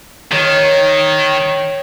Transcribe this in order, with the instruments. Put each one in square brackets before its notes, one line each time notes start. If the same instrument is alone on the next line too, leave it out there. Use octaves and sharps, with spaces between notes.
[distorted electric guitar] D#3 [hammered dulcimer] C#5